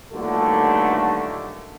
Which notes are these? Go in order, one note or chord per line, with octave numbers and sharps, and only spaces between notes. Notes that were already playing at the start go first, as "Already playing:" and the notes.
G2 A#2 D3 D#3 F#3 A3